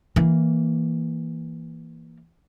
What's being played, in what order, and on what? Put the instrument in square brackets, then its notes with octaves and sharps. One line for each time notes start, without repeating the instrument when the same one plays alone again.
[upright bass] E3 A#3